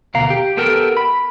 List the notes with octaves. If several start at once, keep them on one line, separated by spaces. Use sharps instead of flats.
D2 B2 F5 A#5
G4
B3 G4 A4 A#4
B5